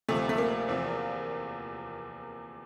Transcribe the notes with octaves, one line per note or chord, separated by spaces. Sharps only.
D2 C3 F3 A3
A3
A#3
E2 C3 F3